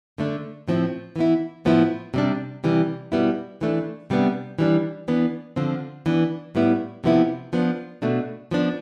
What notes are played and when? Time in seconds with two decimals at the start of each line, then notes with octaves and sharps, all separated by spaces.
0.18 D3 A3 D4
0.68 A2 F3 C4 E4
1.16 E3 B3 E4
1.65 A2 F3 B3 E4
2.14 C3 G3 D4
2.64 C3 E3 G3
3.12 B2 G3 B3 E4
3.61 E3 A3 D4
4.10 C3 G3 B3 D4
4.59 E3 G3 D4
5.08 E3 B3 D4
5.56 D3 F3 C4
6.06 E3 B3 D4
6.55 A2 G3 B3 E4
7.04 C3 F3 B3 E4
7.53 F3 B3 D4
8.02 B2 A3 D4
8.51 F3 B3 D4